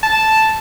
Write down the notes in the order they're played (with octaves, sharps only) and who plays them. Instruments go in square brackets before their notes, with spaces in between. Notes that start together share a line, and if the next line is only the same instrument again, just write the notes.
[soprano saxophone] A5